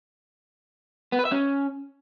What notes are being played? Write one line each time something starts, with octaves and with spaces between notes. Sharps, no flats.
B3
B4
E5
C#4